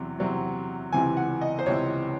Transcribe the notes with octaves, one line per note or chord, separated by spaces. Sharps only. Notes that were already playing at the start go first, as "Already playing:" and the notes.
Already playing: E2 C3 F#3 C4
E2 C3 F#3 C4
C#2 C3 E3 C4 G#5
F#5
D#5
C5
C#2 C3 E3 C4 C#5